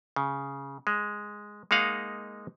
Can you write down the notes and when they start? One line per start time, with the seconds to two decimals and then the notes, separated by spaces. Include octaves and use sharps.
0.16 C#3
0.87 G#3
1.71 G#3 A#3 D#4 F5 F#5